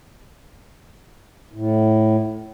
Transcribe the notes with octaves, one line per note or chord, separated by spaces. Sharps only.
A2